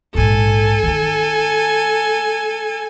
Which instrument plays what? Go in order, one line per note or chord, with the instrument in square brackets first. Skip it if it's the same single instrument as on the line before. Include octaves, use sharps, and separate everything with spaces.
[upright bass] A#1 G#2 [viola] A4 G#5
[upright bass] D#3 D#4